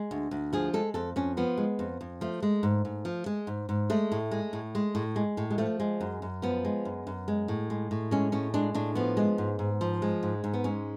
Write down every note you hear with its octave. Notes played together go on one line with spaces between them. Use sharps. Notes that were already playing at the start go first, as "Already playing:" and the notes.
Already playing: G#3
D2
D2
F3 G#4
G#3 A4
F2 A4
F2 C#4
F3 B3
G#3
F2
F2
F3 A3
G#3
G#2
G#2
F3
G#3
G#2
G#2
G#3 A3
A2
G#3
A2
G#3
A2
G#3
A2
G#3
F3 A3
G#3
F#2
F#2
F3 B3
G#3
F#2
F#2
G#3
A2
G#3
A2
G#3 C#4
A2 C#4
G#3 D4
A2 D4
F3 B3
G#3
G#2
G#2
F3
G#3
G#2
G#2
B3
G#3 C#4